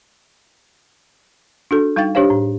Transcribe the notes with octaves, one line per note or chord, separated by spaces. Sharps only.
D4 F#4 A4
G3 D#4 F5 G5 A6
D4 G4 C5 C#5 F5
A2